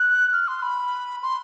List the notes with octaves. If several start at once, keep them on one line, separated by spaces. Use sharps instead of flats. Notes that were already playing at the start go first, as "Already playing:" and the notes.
Already playing: F#6
F6
C6
B5
C6